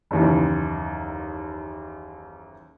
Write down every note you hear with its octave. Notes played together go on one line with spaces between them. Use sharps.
F#1 D#2 E3